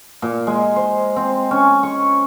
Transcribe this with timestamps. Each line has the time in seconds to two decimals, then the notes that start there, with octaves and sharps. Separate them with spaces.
0.22 A#2
0.47 G#3
0.76 C5
1.16 C4
1.51 C#4
1.83 C#6